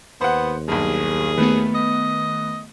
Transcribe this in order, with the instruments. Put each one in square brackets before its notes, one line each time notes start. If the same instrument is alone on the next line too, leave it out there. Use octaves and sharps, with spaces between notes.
[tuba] D#2 [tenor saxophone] B3 [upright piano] C5 F#5
[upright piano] B1 G2 [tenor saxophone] G#4
[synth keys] D#3 A3 B3 [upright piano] B4
[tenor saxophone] D#5